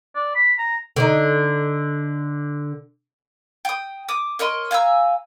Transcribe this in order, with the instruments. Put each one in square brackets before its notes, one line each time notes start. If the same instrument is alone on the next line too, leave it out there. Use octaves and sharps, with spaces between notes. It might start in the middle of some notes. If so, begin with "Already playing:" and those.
[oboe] D5
B5
A#5
[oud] D3 D#4
[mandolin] G5 D#6
D6 D#6
A#4 C#5 D#5 C6
F5 G#5 A#5 E6